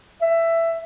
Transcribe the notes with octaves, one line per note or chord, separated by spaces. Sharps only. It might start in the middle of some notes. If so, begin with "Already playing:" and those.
E5